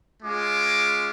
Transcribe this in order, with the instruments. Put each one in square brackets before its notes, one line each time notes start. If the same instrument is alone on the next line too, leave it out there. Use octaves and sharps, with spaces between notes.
[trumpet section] G#3 C#4 F4 D6